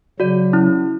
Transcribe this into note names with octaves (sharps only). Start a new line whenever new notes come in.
C#3 F#3 F#4 D5
C#4 E4